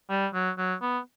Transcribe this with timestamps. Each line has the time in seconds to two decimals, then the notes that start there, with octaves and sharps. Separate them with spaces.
0.10 G3
0.34 F#3
0.58 F#3
0.82 B3